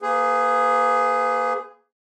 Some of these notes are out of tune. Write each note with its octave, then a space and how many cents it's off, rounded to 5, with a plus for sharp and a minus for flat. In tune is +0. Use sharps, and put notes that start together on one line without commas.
A#3 +0 G#4 +0 B4 +40